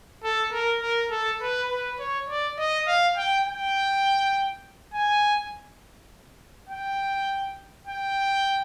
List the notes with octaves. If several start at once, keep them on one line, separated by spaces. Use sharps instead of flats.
A4
A#4
A#4
A4
B4
B4
C#5
D5
D#5
F5
G5
G5
G#5
G5
G5